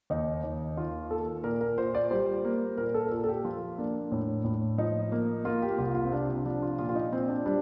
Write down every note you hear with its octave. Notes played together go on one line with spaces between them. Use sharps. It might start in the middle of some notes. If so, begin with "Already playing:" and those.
D#2 D#4
D#2
D#3 F4
A#3 A4
A#2 A#4
A#4
A#2 C5
D5
G3 C5
A#3
A#2 A#4
A4
A#4
A#2 A4
A4
G4
F3 F4
A#3 D4
A2
A2
F3 D#4
A#3
A#3 F4
G4
C2 F4
F4
C4
C3 D4
D4
F3 D4
F4
A#2 F4
F4
D#4
A#2 C4
D4
G3 D4